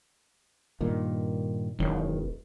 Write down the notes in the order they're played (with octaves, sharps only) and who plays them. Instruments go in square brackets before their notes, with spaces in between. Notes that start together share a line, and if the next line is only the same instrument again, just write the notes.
[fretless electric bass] G2 A#2 D#3
[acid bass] E1 [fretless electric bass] F#2 D#3 C#4